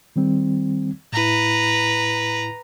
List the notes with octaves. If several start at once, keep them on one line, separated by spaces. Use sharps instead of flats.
D#3 G3 C4
A2 E4 B4 A#5